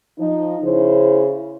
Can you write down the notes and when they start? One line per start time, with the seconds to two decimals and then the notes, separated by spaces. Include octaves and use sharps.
0.19 F3 D#4
0.63 C#3 E4 C5